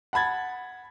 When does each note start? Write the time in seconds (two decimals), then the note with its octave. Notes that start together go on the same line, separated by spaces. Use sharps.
0.13 F#5 A5 B5 G#6 A6